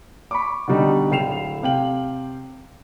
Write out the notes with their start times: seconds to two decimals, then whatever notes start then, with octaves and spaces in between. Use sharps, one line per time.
0.31 B5 C#6 D6
0.68 B2 D3 G3 D#4
1.11 D1 A2 G5 C7 E7 F7
1.63 C3 F5 G5 F#7